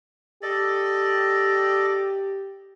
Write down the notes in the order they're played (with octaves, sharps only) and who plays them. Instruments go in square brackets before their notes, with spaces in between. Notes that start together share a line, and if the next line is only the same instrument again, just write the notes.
[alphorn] G4 [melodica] A4 D5 D#5